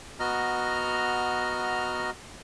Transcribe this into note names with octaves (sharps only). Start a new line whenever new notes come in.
B3 F#4 D#5 A#5 F6